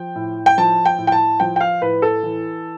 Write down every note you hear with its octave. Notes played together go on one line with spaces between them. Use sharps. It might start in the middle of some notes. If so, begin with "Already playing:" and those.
Already playing: F3 G5
A2
G5
F3 A5
G5
A2
G5
A5
F3 G5
G5
F5
A2 B4
A4
E3